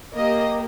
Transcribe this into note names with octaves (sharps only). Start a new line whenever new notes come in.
A#3 G4 D#5